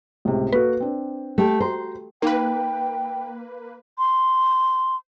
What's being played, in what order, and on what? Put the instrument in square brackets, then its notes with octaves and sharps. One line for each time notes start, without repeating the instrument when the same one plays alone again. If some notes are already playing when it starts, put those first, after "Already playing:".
[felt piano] C#2 A2 C3
[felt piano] A#3 F#4 A4 [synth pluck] B4
[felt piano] C4 D4
[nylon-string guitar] A3 G4
[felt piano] F#4 A#5 C6 [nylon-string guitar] C5
[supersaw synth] A#3 B4 [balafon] D#4 [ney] G5
[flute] C6